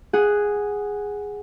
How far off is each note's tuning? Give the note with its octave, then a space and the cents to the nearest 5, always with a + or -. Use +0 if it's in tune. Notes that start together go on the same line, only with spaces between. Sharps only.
G#4 -5 F#5 +0